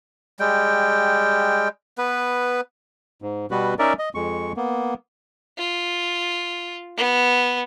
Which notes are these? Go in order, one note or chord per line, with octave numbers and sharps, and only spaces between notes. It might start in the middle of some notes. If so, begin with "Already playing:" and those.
G3 G#3 G5
B3 B4
G#2
B2 G3 B3 F#4 B4
C#4 D#4 A#4 D5 E5
D#5
F2 G#3 C#6
A#3 B3
F4
B3